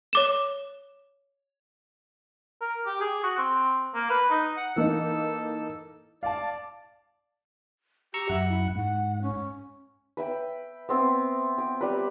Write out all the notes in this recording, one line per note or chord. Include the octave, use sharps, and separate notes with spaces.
C#5 D6 E7
A#4
G4
G#4
F#4
C4
A#3
B4
D#4
F#5
E3 A#3 D#4 A4
D5 F5 A5
G4 A#5 C#6 E6
F#2 E5 F#5
E4
G#2 F#5
C#4
B4 E5 G5
B3 C4 E5
G5
G3 B4